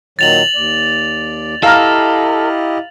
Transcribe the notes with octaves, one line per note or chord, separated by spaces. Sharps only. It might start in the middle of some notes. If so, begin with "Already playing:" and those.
A#2 D#3 F#3 A6 F7 F#7
D#2 D5
E4 G4 A4 D#5 F5 A#5 F6